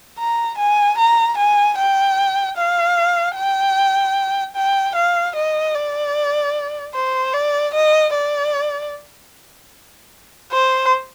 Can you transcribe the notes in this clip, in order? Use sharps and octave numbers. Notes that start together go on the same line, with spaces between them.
A#5
G#5
A#5
G#5
G5
F5
G5
G5
F5
D#5
D5
C5
D5
D#5
D5
C5